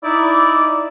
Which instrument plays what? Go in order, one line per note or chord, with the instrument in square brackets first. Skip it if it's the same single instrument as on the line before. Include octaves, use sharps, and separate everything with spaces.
[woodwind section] D#4 E4 D5